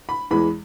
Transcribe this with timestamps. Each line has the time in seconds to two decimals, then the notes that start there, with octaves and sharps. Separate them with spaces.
0.09 B5
0.31 E2 E3 G#3 B5